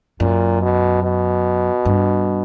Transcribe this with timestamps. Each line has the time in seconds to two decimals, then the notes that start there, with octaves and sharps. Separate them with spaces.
0.20 F#2 A#2
0.62 B2
1.03 B2
1.85 G2